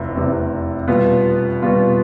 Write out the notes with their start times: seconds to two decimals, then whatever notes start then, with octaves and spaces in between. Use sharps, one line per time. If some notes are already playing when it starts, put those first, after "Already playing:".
Already playing: F1 E2 C3
0.15 F1 E2 C3
0.88 B2 G3 B3 F4
1.62 B2 G3 B3 F4